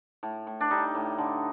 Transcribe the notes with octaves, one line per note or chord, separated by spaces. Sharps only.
A2
A2
D4
G3 D#4
A2
D3